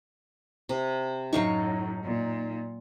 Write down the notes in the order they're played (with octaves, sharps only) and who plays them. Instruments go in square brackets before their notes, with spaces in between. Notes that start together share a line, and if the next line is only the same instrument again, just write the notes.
[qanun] C3
[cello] F#2 A2 [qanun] F#3 F5 C#6 [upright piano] D#4
[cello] A#2